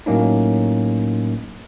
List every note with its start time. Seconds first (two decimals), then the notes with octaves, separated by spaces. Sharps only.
0.06 A2 F#3 A#3 C#4 D#4